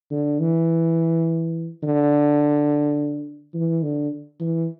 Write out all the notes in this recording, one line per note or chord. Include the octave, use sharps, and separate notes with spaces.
D3
E3
D3
E3
D3
E3